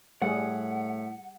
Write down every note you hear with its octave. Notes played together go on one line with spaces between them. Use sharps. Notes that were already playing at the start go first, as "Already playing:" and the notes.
A2 G3 G#4 F#5